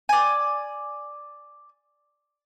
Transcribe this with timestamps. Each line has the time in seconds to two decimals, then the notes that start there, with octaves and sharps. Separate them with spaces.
0.09 D5 G#5